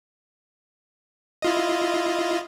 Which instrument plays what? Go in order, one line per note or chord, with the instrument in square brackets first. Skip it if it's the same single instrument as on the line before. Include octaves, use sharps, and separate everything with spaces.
[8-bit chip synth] E4 F4 D#5